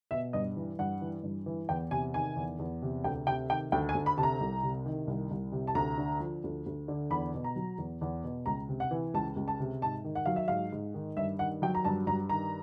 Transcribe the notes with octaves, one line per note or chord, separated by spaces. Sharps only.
B2 E5
G2 D#5
E3
G2 F#5
E3
G2
E3
E2 G5
C3 G#5
D#3 G#5
E2
E2
C3
D2 G5
C3 G5
D#3 G5
D2 G5
G#5
D2
B5
C3 A5
A#5
C2
C3
D#3
C2
C2
C3
A5
D2 A#5
D3
F3
D2
D2
D3
E2 B5
B2
A#5
F#3
E2
E2
B2
C#2 A#5
C3
F#5
E3
C#2 A5
C#2
A5
C3
G#2 A5
D#3
F#5
F#3 F5
E5
G#2 F5
G#2
D#3
G2 E5
D#3 F#5
F#3 G5
A#5
G2 A5
G2 A#5
D#3 A#5